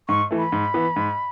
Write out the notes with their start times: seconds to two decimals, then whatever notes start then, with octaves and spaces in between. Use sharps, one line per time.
0.09 G#2 C#6
0.31 E3 A3
0.38 B5
0.52 G#2
0.74 E3 B3
0.96 G#2